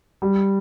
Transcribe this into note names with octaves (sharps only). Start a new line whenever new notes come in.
G3